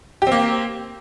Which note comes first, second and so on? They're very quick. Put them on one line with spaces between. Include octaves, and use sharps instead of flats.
G4 C4 A#3